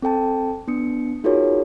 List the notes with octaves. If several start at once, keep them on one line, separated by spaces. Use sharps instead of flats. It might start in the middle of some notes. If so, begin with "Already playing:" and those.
C4 A4 G5 A5
B3 D4 D#6 C#7
D#4 F4 F#4 G#4 A#4 C#5